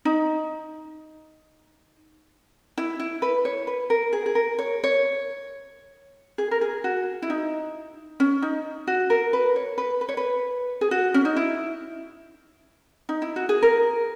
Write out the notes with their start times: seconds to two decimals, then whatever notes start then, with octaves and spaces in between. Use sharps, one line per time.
0.05 D#4
2.78 E4
3.00 E4
3.22 B4
3.45 C#5
3.67 B4
3.90 A#4
4.13 G#4
4.26 G#4
4.35 A#4
4.59 C#5
4.84 C#5
6.38 G#4
6.51 A#4
6.61 G#4
6.84 F#4
7.22 E4
7.30 D#4
8.20 C#4
8.42 D#4
8.87 F#4
9.10 A#4
9.33 B4
9.56 C#5
9.78 B4
10.01 B4
10.09 C#5
10.17 B4
10.81 G#4
10.91 F#4
11.14 C#4
11.25 D#4
11.36 E4
13.09 D#4
13.22 E4
13.36 F#4
13.49 G#4
13.62 A#4